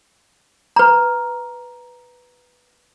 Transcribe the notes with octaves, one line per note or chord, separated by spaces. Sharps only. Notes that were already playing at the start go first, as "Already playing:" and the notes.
B4 A#5